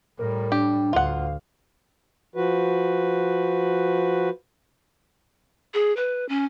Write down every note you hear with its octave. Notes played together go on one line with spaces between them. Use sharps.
A2 G3 A#4
D4 G4
D2 F4 F5 F#5
F3 F#4 B4
G#4
B4
C#4